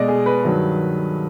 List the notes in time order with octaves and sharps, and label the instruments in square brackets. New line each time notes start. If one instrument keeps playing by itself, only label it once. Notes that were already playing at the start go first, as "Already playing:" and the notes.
Already playing: [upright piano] B2 G#3 D5 D#5
G#4
B4
G2 D#3 F#3